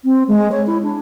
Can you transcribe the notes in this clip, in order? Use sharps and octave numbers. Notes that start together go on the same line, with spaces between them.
C4
G#3
C#5
E4
D4